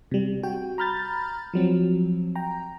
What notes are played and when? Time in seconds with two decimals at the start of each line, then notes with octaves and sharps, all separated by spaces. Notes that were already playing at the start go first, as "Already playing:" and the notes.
0.11 C3 G3
0.43 F#4 G5
0.78 A#5 B5 F6 G6 A6
1.53 F3 F#3 C4
2.36 G5 A#5